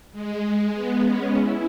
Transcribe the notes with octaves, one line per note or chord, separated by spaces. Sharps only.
G#3
B3
C#4
E4